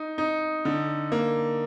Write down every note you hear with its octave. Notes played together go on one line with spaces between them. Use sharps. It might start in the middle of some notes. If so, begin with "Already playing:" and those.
Already playing: D#4
D#4
D3
A#3